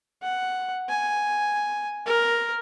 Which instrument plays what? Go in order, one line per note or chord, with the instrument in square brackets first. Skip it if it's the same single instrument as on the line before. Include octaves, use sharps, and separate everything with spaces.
[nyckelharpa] F#5
G#5
A#4